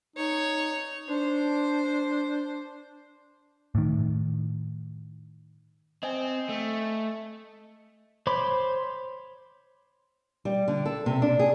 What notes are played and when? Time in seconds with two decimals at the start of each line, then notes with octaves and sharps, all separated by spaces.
0.16 D#4 C#5
1.09 D4 C5
3.75 A2 D#3
6.03 C4 D#5 G#5
6.49 A3
8.27 C5 C#5 B5 C6 D6
10.45 G3
10.68 D3
10.86 A4
11.06 C3
11.22 D4
11.39 G#4